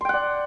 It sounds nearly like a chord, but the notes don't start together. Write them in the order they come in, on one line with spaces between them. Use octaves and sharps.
C6 G5 F#5 D5